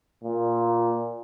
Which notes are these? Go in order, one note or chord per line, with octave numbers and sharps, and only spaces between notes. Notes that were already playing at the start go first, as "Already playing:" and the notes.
A#2